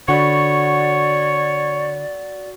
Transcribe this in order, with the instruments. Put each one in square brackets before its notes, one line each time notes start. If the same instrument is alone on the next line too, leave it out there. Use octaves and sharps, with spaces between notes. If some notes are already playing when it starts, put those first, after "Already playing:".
[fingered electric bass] D3 [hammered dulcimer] F#4 B5 [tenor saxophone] C#5 [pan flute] D5